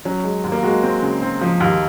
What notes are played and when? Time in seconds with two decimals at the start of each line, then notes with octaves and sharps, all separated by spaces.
0.05 F#3 C#4
0.24 G#3
0.44 D#2
0.52 A#3
0.63 G#3 F#4
0.83 C4
1.02 C#3
1.22 C4
1.41 F3
1.60 D#2